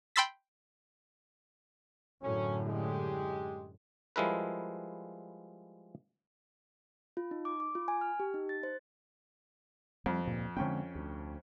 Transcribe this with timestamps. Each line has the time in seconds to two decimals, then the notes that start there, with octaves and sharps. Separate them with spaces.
0.16 G5 B5 C6 E6 A6 B6
2.22 F#2 A2 D3 F#3 C#4
2.66 G#3 G4
4.16 F3 G3 G#3 E4 A#4 B4
7.17 F4
7.31 D#4
7.45 D6
7.60 D6
7.75 F4
7.88 G#5
8.01 F6
8.20 G4
8.34 D#4
8.49 A6
8.63 C5
10.06 F2 G3 C4
10.25 D2 G2 A#2
10.57 F2 D3 G#3 C4 C#4 G5
10.95 D2